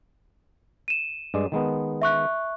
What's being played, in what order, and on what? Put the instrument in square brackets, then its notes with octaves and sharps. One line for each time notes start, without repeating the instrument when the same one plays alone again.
[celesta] D#7 E7
[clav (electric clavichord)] G2 G#3 D5
D#3 G#3 B3
[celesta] E5 C#6 F#6